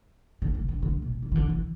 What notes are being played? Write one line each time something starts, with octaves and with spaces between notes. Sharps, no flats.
D3
C#3
D3
D3
B2
D3
E3
D3
E3